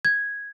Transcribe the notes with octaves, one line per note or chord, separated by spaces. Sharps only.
G#6